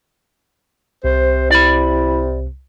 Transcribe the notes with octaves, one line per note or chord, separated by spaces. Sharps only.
C2 C3 C5
E4 D5 B5